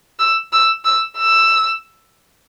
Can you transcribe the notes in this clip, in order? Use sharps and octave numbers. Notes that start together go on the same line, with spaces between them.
E6
E6
E6
E6